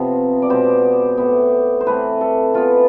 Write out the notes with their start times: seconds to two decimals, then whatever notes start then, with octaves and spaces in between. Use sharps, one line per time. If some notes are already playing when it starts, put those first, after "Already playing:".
Already playing: C3 F3 B3
0.42 D5
0.49 B2 G#3 B3 C5
1.18 A2 E3 B3
1.81 C5
1.87 E3 A3 C4 B4
2.21 A4
2.54 E3 B3 F4